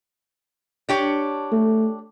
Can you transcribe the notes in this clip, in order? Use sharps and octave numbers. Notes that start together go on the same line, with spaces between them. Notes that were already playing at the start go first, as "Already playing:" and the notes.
D4 G4 C#5
A3